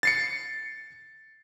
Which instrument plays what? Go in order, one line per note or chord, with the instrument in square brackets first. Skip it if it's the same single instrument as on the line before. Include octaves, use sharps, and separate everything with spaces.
[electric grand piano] A6 C7 C#7